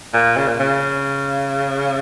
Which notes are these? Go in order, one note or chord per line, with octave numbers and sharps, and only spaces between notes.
A#2
C#3
A#2
C#3